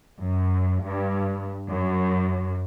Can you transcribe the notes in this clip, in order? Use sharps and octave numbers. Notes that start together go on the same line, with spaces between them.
F#2
G2
F#2